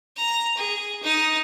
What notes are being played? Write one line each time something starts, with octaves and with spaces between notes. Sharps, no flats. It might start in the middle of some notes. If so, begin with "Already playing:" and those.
A#5
G#4
D#4